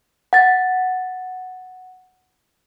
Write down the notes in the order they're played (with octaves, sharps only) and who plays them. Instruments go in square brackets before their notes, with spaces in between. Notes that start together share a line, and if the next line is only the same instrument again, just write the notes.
[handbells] F#5 A6